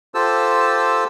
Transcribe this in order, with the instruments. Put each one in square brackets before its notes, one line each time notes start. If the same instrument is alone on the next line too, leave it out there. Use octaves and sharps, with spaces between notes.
[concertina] F4 G4 A4 C5 A5 E6